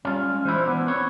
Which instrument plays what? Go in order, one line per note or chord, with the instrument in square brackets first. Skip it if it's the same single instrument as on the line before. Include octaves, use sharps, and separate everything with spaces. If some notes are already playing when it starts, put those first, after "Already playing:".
[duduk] G3 [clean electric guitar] C#4 F4
[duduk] G#3
[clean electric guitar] E3 D4 E4 [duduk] C5
[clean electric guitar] E3 D4 [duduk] B3
[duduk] C4 [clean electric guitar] B4 C#5